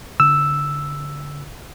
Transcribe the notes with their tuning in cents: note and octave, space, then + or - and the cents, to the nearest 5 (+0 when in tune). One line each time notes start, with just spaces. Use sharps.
D3 -30 E6 +0